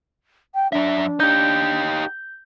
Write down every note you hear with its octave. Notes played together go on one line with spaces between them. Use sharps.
G5
F#2 D4 E5
D#4 G4 G6